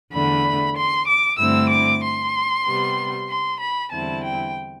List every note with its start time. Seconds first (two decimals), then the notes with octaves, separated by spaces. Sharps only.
0.12 E2 D3 A3 D4 B5
0.76 C6
1.07 D6
1.38 G2 D3 A3 C4 E4 E6
1.70 D6
2.02 C6
2.66 C3 G3 B3
3.29 C6
3.60 B5
3.92 E2 D3 G3 C4 E4 A5
4.24 G5